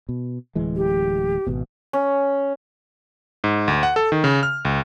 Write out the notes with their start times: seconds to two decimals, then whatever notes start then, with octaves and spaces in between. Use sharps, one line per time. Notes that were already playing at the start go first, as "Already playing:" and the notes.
0.09 B2
0.55 D1 E3 G#3
0.76 G4
1.47 G#1 B2
1.93 C#4
3.44 G#2
3.68 D2
3.83 F#5
3.96 A4
4.12 D#3
4.24 C#3
4.43 F6
4.65 C#2